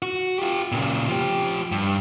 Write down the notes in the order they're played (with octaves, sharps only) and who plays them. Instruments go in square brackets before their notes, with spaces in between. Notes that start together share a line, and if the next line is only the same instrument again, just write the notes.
[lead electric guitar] F#4
F4 G4
A#2 C#3
F3 G4
G2